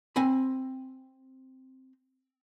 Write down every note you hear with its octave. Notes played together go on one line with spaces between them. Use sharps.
C4 G#5 B5